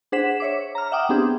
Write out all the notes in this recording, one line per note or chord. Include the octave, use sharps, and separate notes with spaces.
D4 G#4 C5 F#5 B6 E7
C#5 E5 D6
A#5 F6
E5 F#5 G5 D6 D#6
B3 C4 D4 G4 G#4